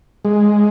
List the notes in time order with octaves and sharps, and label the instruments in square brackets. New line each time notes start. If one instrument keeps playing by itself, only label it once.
[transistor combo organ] G#3